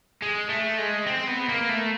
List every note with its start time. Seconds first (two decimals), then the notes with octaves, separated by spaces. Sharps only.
0.22 G#3
0.49 A3
0.78 G#3
1.07 C4
1.27 B3
1.49 A#3
1.69 A3